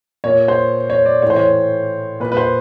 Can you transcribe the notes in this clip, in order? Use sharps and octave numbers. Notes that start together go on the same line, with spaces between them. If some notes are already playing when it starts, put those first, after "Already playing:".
A#2 C#5
C5
C#5
D5
A2 E3 C5 C#5
C#5
A#2 B4
B4
C5